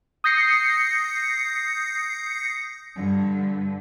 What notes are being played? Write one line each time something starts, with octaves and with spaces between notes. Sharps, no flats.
D#6 G6 A#6 C7 C#7
G2 D3